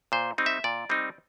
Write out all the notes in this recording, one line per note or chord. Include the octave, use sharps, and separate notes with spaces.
A#2 C5
G3 C4 D#4
E5
A#2 D5
G3 C4 D#4